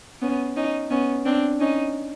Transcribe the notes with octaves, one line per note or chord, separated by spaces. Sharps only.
B3 C#4
C#4 D#4
B3 C#4
C4 D4
C#4 D#4